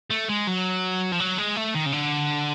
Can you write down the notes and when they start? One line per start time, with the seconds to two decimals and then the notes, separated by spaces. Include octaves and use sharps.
0.11 A3
0.29 G#3
0.48 F#3
1.12 F3
1.20 F#3
1.38 G#3
1.56 A3
1.74 D#3
1.86 C#3
1.92 D3